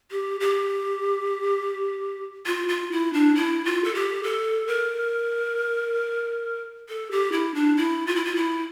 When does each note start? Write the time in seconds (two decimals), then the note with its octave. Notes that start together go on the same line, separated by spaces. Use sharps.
0.11 G4
0.40 G4
2.46 F4
2.69 F4
2.92 E4
3.13 D4
3.35 E4
3.65 F4
3.84 A4
3.95 G4
4.23 A4
4.67 A#4
6.89 A4
7.11 G4
7.32 E4
7.54 D4
7.77 E4
8.07 F4
8.15 E4
8.25 F4
8.36 E4